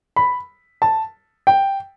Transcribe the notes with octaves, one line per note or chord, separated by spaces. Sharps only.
B5
A5
G5